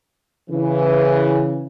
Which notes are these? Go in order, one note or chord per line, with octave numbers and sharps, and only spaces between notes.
C#3 E3